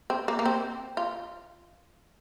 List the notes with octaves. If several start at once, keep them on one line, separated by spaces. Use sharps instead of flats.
C4
A#3
A#3
C4
F4